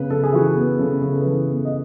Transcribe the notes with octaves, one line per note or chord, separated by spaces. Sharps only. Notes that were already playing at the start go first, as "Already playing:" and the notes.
Already playing: C#3 B3 B4
C#3 A4
G#4
E3 F#4
G#4
B3
C#3 A4
C#3
A4
B4
E3 A4
B3
D#5